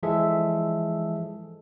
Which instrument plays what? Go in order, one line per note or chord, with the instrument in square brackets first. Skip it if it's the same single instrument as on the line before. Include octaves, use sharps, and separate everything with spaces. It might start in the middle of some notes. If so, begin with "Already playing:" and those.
[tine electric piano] E3 F3 G#3 G#4 A4 E5